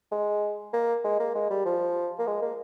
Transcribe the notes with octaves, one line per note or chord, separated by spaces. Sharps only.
G#3
A#3
G#3
A#3
G#3
G3
F3
A#3
G#3
A#3